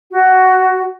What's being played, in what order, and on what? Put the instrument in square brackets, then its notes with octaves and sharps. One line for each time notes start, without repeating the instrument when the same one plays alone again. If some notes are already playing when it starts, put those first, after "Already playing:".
[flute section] F#4